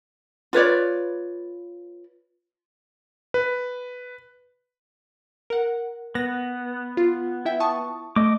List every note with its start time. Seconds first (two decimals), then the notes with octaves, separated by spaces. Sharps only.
0.53 F4 B4 C#5 D5
3.34 B4
5.50 A#4 F#5
6.15 B3 A#6
6.97 F4
7.45 E4 E5 G5
7.60 A5 C#6 D#6
8.16 A3 D#5 D6